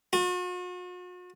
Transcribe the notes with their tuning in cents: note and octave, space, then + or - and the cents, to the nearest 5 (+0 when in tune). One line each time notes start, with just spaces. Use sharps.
F#4 -45